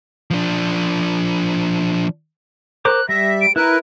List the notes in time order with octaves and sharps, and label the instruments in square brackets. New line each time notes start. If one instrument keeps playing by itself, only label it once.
[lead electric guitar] F3 D4
[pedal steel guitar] A#4 C5 D6 [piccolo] F#6
[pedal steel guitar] G3 [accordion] E5 [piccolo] A#6
[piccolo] D7
[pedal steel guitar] E4 [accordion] A#4 B4 [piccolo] F#6